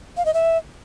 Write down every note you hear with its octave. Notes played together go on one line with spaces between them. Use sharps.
F5
D#5
E5